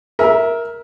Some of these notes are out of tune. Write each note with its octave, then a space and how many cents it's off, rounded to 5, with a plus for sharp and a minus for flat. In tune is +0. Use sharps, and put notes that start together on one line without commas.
A#4 +10 E5 -10